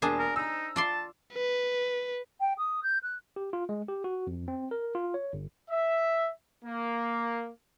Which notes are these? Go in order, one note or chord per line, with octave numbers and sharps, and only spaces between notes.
E1 A#3 D4 G#4 C5 A5
A#4
D#4 A#5 E6
F4 D5 A5 C6
B4
G5
D#6
G6
F#6
G4
F4
G#3
G4
F#4
F2
C4
A#4
F4
C#5
G1
E5
A#3